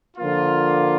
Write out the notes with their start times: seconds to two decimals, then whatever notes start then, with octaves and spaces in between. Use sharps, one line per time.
0.17 D3 F3 A#3 F4